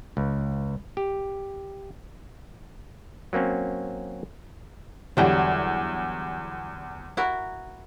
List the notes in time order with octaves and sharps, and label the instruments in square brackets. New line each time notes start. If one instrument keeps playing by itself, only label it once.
[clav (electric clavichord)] C#2
G4
F#3 A#3 C4 C#4
[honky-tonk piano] E2 D3 [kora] F#3 G3 G5
[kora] E4 F#4 A#4